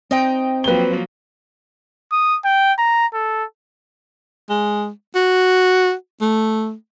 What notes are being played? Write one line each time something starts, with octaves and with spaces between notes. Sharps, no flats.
C4 D#4 D#5 G5
F3 F#3 A#3 B4 G7
D#6
G5
A#5
A4
G#3
F#4
A3